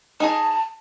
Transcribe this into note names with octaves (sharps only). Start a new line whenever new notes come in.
D#4 G#4 D#5 A5